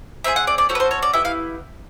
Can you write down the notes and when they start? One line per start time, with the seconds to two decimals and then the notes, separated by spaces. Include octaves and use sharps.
0.24 C4 D#4 G#4 E5
0.36 F#5
0.47 D5
0.58 D5
0.69 C#4 F#4 A4 C5
0.75 B4
0.80 C5
0.91 C#5
1.02 D5
1.13 B3 E4 G4 E5
1.25 F5